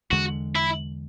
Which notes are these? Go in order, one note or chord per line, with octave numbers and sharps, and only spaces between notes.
E2 D3 G#3 F#4
E4